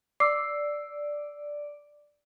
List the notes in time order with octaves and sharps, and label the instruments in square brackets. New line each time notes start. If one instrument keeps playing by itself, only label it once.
[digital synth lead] D5 [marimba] D6 [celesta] E6 C7